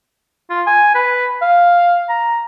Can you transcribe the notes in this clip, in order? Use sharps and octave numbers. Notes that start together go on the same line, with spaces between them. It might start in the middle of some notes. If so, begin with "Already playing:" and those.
F4
G#5
B4
F5
A#5